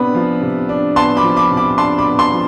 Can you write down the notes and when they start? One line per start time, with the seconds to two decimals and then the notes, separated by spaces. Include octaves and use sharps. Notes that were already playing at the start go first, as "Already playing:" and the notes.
Already playing: C3 B3 D4 B5
0.15 F3
0.41 C3
0.69 D4
0.96 B3 A5 C6
1.17 B5 D6
1.23 F3
1.37 B5 D6
1.51 C3
1.57 B5 D6
1.78 D4 A5 C6
1.98 B5 D6
2.05 B3
2.19 A5 C6
2.32 F3